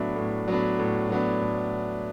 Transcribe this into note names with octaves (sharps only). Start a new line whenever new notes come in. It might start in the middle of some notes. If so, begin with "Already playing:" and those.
Already playing: A2 F#3 B3 D4 E5
A2
F#3 B3 D4
A2
F#3 B3 D4
A2